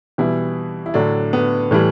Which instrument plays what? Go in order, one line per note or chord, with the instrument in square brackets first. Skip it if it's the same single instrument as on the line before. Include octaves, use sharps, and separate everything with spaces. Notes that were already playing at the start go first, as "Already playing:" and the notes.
[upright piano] B2 E3 G3 E4
E4
A2 D3 F#3 D4
B3
A2 E3 G3